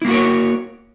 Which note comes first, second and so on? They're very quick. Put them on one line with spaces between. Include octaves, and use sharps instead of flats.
E4 A#3 F#4 A#4 C#5